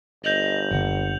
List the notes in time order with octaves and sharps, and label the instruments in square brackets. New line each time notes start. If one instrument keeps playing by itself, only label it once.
[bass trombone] G1 [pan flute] D#5 [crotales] G6 F7 F#7
[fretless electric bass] F#1 D3 [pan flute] F#5